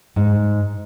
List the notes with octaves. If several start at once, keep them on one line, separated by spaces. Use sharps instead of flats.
G#2